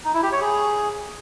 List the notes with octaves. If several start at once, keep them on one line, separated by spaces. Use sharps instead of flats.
D#4
E4
G4
C#5
G#4